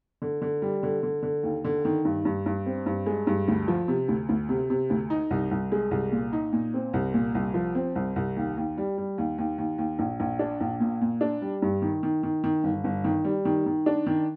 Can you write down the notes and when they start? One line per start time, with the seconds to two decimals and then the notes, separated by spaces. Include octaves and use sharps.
0.22 D3
0.42 D3
0.62 G3
0.83 D3
1.03 D3
1.23 D3
1.43 D#2
1.65 D3
1.85 D#3
2.05 G2
2.25 G2
2.46 G2
2.66 C4
2.86 G2
3.06 G#3
3.27 G2
3.48 D2
3.68 F3
3.88 C3
4.08 D2
4.29 D2
4.49 C3
4.70 C3
4.90 D2
5.10 D#4
5.31 C2
5.51 C2
5.72 G#3
5.91 C2
6.12 A#2
6.33 D#4
6.53 A#2
6.74 C4
6.93 C2
7.14 A#2
7.35 C2
7.54 F3
7.75 C4
7.95 C2
8.16 C2
8.36 D#2
8.57 D#2
8.77 G3
8.98 G3
9.18 D#2
9.38 D#2
9.58 D#2
9.78 D#2
9.99 A#1
10.20 A#1
10.39 D4
10.60 A#1
10.80 A#2
11.01 A#2
11.21 D4
11.42 G3
11.62 G2
11.82 D#3
12.03 D#3
12.23 D#3
12.44 D#3
12.64 G1
12.84 G1
13.04 D#3
13.25 G3
13.45 D#3
13.66 D#3
13.86 D4
14.06 D#3